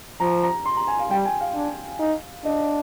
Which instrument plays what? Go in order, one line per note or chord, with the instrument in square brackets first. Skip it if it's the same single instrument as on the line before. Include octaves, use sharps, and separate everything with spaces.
[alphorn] F3 [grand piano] A#5
[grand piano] A#5
C6
A#5
G#5
F5
[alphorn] G3 [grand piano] G5
[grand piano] G#5
F5
[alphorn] D4
D#4
[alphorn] D4 [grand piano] D#5